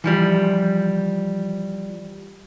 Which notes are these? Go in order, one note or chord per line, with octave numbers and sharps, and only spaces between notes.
E3 F3 G3